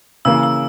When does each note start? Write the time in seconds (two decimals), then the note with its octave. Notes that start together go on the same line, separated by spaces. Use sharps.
0.25 C#3 E3 A#3 E6
0.43 E6